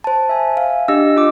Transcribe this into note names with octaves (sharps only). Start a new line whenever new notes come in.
C5 A5
E5 G#5
F5
D4 G4 D#5 E6
F4 D#5 D6